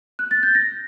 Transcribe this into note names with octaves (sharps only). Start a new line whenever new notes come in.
F#6
A6
G6
A#6